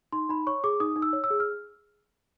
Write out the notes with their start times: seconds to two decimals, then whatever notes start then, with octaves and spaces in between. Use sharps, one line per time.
0.12 D#4 C6
0.29 D#4 B5
0.47 C#5 C#6
0.64 G#4 D6
0.80 D#4 D#6
0.96 D#4
1.02 E6
1.13 C#5
1.24 E6
1.30 G#4
1.40 F6